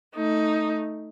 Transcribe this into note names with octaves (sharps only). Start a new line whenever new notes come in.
A3 D#4